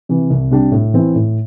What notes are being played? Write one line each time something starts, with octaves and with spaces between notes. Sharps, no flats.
C3 E3
C2
C3 G3 D4 G4
A2
E3 C4 E4
A2